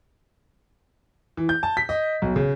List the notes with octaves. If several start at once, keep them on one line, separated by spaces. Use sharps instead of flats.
E3
G6
A5
B6
D#5
B1
C#3